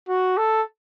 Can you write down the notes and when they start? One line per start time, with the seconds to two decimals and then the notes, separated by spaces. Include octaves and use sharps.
0.09 F#4
0.37 A4